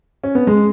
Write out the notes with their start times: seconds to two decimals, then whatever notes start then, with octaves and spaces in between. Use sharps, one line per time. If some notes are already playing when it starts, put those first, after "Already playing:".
0.23 C#4
0.35 B3
0.47 G#3